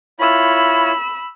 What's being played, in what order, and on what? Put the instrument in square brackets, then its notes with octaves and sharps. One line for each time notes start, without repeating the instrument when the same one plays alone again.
[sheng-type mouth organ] E4 F4 C#5 [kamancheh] B5 E6